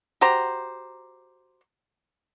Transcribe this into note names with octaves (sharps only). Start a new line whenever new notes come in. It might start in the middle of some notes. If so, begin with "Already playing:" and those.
F#4 G4 C5 A#5